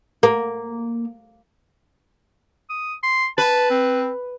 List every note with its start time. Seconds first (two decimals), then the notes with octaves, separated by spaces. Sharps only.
0.23 A#3
2.70 D#6
3.03 C6
3.38 B4 A5
3.71 C4